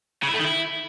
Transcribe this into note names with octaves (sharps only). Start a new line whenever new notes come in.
C#3
E4
A3
D#3
E4